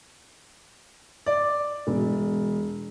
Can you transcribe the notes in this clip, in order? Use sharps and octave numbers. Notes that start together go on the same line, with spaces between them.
D5
E1